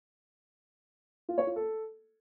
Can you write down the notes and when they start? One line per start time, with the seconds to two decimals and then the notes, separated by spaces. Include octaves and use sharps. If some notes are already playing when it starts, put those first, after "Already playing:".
1.29 F4
1.38 C#5
1.47 F4
1.56 A4